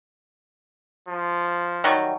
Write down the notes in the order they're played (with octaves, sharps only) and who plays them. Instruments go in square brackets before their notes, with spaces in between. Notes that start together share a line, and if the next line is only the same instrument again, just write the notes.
[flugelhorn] F3
[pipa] D#3 F#3 G3